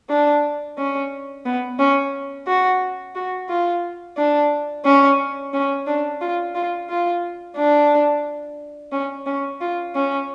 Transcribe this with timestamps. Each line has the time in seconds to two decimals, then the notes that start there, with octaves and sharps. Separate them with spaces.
0.10 D4
0.78 C#4
1.46 B3
1.79 C#4
2.47 F#4
3.15 F#4
3.49 F4
4.17 D4
4.85 C#4
5.53 C#4
5.87 D4
6.21 F4
6.55 F4
6.89 F4
7.57 D4
8.92 C#4
9.26 C#4
9.61 F4
9.95 C#4